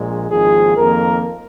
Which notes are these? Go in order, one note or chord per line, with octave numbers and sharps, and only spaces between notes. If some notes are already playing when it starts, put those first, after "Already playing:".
Already playing: A#1 A#2 G#3
G#1 G#2 F3 A#3 G#4
F2 D#3 A#3 A#4